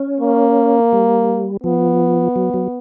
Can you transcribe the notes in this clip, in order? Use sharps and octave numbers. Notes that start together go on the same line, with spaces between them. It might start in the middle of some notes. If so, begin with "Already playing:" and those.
Already playing: C#4
A#3
G3
F3 B3
F#3
F#3